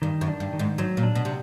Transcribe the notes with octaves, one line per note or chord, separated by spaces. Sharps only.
G2 D#3
F#2
D4
G2
D#3
G#2
G#2 F#3
A#2
D4
B2
C3